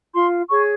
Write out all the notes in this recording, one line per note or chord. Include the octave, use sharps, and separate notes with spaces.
F4 C6
G#4 C#5 C#6